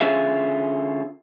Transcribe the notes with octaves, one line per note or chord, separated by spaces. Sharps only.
D3 C#4 F4 G#4 E5